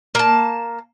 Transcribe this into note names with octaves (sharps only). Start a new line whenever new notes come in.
A#3 A5